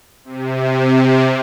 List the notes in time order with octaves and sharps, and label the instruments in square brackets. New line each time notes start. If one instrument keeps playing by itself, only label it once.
[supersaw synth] C3